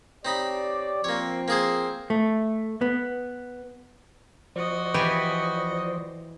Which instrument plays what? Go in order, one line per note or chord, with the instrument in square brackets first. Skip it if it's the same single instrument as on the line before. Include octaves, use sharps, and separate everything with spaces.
[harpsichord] C4 D#4 B5 [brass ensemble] G4 C#5 D5
[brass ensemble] F3 C4 [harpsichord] A#3 C#5
[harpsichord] A#3 G#4 C5
[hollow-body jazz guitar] A3
B3
[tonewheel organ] F3 C5 D5 [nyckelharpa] F#4 D#5
[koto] E3 G4 G#5 [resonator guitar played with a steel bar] B4